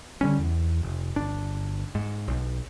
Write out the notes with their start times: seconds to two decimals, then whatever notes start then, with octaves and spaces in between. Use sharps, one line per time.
0.21 D3 G3 C#4
0.39 E2
0.83 F1
1.16 G1 D4
1.95 G#2
2.28 B1